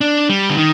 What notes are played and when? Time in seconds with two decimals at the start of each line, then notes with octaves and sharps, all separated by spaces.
0.01 D4
0.29 G3
0.50 D3
0.57 D#3